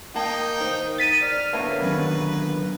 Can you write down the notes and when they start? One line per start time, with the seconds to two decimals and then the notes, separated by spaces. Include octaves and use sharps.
0.16 A#3 D#4 G5 A5
0.61 D#3 C5
0.98 A6 B6 D#7
1.22 D5 F6
1.53 D3 A#3 B3 C#5 E5 A5
1.82 D#3 F#3 C#4 B4